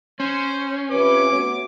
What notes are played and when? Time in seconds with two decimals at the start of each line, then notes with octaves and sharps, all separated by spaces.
0.20 C#4 C5
0.91 C3 F3 B4 D6
1.32 A3 B3 F#4